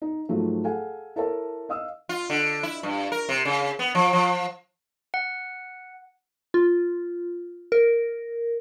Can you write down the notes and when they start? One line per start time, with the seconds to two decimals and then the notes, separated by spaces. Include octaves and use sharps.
0.02 D#4
0.29 G#2 F3 F#3 A3
0.64 G#4 A4 F5 F#5 G#5
1.16 E4 A4 A#4 C#5 E5 A5
1.69 D#5 F5 D#6 E6
2.09 F4
2.30 D3
2.63 E4
2.83 G2
3.12 A#4
3.29 C3
3.45 C#3
3.79 B3
3.95 F3
4.13 F3
5.14 F#5
6.54 F4
7.72 A#4